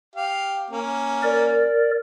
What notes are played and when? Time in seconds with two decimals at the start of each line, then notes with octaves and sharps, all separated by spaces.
0.16 G4 F5
0.70 A#3 C#4
1.23 A#4 D5